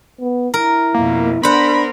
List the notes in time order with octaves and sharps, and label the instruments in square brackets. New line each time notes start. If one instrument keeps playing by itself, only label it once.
[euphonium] B3
[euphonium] E4 [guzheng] A#4
[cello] F2 B2 [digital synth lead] A#3
[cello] B3 A#4 [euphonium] D4 [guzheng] C5 F#5 [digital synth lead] B5